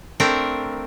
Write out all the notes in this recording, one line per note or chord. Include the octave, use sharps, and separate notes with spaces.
A3 C4 D4 A#4